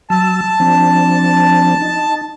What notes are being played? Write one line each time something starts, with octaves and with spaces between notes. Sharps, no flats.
F#3 A5 E6
F3 C4 D4
D#4